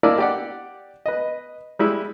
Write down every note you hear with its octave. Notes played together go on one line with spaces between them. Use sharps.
A#3 D4 E4 A#4 D5 D#5
G4 D5 F#5
B4 D#5
G3 G#3 E4